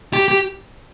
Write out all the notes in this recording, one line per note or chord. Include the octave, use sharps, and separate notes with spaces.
G4
G4